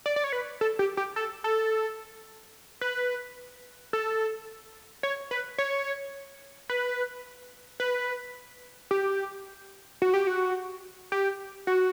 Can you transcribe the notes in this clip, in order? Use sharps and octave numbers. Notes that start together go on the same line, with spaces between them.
D5
D5
C#5
B4
A4
G4
G4
A4
A4
B4
A4
C#5
B4
C#5
B4
B4
G4
F#4
G4
F#4
G4
F#4